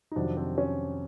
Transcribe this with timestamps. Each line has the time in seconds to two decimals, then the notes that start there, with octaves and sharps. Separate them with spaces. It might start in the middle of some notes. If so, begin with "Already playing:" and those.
0.11 D#4
0.16 F2 C3 D#3 F#3 D4
0.37 C4
0.58 C#4